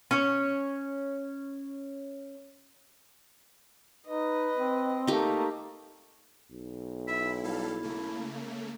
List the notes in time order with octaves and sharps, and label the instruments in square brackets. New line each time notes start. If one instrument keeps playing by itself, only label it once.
[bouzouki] C#4 C#5
[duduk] D#4 [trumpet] B4 [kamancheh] D#5
[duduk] C4
[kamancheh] A3 A#3 [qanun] D#4 G4
[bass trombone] B1
[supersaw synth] E4 [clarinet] E5
[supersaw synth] G3 A4 F5 [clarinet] E4
[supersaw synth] C#3 A3 A#3